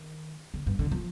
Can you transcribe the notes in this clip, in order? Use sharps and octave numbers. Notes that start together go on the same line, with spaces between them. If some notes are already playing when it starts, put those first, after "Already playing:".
Already playing: D#3
D3
G2
D3
F3